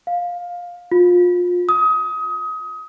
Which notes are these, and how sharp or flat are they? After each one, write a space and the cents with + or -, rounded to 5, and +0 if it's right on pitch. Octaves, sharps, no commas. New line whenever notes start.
F5 +15
F4 +30
D#6 +25